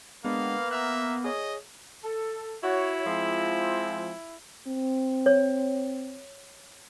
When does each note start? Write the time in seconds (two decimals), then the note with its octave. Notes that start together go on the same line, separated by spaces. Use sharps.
0.25 G#3 A#3 B3 D4 F5
0.71 E5 A#5 F6 F#6
1.24 G#4 C#5 D#5
2.04 A4
2.63 E4 F#4 C#5
3.06 F3 G#3 C4
4.68 C4
5.26 C#5